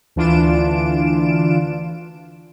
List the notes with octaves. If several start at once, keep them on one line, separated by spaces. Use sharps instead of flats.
D2 E3 D4 F4 D7 E7